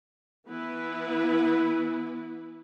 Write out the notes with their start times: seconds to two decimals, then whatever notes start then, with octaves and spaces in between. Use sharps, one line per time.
0.49 E3 B3 E4 B4